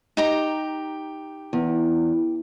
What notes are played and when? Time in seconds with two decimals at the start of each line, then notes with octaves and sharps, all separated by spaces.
0.17 D#4 G4 A#5
1.53 E2